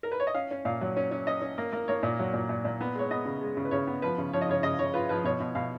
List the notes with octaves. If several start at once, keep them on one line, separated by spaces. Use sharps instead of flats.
A#4
B4
C#5
D#5
C#4 F5
C#4
A#2 F5
F#3
C#4
C#4
C#4 D#5
C#4
A#3
A#3
A#3 C#5
A#2
F#3
A#2
A#2
A#2
B3
G#3 C#5
B3 D#5
C#3
G#3
C#3
B4
C#3 C#5
B3
F3 B4
C#3
F3 C#5
D#5
C#3 C#5
C#3 D#5
C#3 C#5
F4 B4
F3 B4
B2 C#5
B2
B2 F5